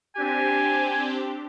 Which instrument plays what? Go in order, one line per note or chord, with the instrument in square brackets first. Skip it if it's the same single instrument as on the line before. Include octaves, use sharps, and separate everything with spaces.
[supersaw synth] C4 D4 G4 [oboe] G#5